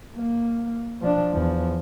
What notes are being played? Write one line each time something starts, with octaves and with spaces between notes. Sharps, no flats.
A#3
F3 D4
E2 F3